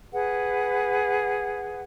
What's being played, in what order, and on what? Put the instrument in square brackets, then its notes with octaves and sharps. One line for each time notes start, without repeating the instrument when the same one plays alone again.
[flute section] G#4 B4 F#5